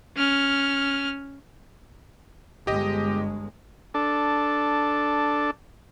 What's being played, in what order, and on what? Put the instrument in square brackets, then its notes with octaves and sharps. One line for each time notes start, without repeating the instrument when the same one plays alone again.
[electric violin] C#4 F6
[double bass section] G1 G#3 [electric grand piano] G4 D#5
[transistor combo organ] D4 A4